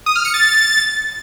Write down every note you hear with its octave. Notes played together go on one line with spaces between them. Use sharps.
D#6
F6
C#7
A6